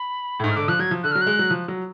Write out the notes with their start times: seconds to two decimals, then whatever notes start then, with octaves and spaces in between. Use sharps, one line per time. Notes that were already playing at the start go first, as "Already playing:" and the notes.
Already playing: B5
0.40 A2
0.44 G#2 C#6
0.51 F6
0.56 D3 D6
0.68 F3 F#6
0.79 F#3 G#6
0.91 F3
1.03 D3 F#6
1.12 F#3 F6
1.21 F#6
1.27 G#3
1.39 F#3
1.50 F3
1.68 F#3